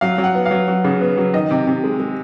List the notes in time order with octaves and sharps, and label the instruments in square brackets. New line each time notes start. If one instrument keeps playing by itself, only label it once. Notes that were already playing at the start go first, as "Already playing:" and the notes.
[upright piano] F#3 F5
F#3
F#5
B3
F5
F#3
F#3
C#3
B3
F#3
D#3 D#5
C3
C3
G#3
G#3